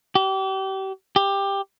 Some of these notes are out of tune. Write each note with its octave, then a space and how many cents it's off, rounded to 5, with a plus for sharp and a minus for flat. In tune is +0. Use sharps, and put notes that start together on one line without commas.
G4 -35
G4 +15